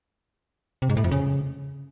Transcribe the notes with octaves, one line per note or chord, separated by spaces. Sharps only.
C3
G#2
A2
F2
C#3